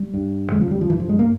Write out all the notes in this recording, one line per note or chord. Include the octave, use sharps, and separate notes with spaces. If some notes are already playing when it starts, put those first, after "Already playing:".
Already playing: G3
G2
E2 C#3 G#3
F3
G3
F3
G2 E3
F3
G#3
A#3